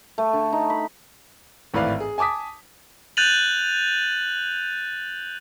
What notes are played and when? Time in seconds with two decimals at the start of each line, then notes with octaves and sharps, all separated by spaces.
0.18 A3
0.33 D3
0.52 D#4
0.70 B5
1.74 G#1 A2 E3 B4 D5 F5
2.00 G#4
2.18 G#5 A5 D6 D#6 B6
3.17 F#6 G6 A6 D#7 F7 F#7